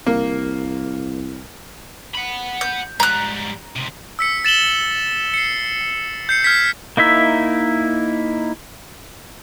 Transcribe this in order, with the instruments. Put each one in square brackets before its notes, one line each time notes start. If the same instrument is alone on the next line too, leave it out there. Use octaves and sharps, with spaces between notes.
[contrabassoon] C2 [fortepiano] A#3
[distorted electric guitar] F#5 B5
[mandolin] G6
[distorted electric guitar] G#2 G3 [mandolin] A#5 F#6
[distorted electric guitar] C#2 C3
[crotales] E6 B6 C#7
A6 E7 F#7 G7
C7 C#7
G6 C7 C#7
F6 G#6 B6
[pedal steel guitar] A#3 D#4 E4 E5